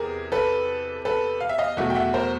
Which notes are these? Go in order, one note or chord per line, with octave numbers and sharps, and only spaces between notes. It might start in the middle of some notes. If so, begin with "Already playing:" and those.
Already playing: E2 C3 G#4 A#4
A4 B4
A4 B4
F5
E5
D#5 F5
E2 B2 F#3 A3 E5 F#5
G5
E5 F#5
A#4 C5